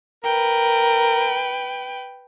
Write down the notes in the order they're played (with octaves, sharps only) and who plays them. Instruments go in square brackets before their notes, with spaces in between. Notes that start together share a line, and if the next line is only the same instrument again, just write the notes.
[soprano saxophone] A#4 [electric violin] B4 G5